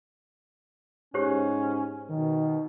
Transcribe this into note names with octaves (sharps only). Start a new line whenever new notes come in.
G#2 C#4 G4 C5 C#5
B2 D#3